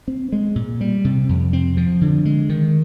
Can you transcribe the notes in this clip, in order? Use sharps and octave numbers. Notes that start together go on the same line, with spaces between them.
C4
G#3
A#2
G3
C3
F2
C4
F3
D3
G#3
D#3